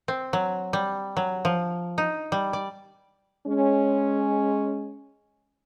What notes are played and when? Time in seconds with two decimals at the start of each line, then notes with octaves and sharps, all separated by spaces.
0.08 C4
0.33 F#3
0.73 G3
1.17 F#3
1.45 F3
1.98 D#4
2.32 G3
2.53 D5
3.47 G#3 C#4